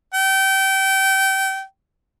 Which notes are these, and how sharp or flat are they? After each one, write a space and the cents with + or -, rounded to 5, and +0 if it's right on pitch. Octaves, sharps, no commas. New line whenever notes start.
G5 -25